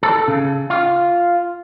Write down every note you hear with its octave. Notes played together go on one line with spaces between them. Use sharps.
A4
C#3
F4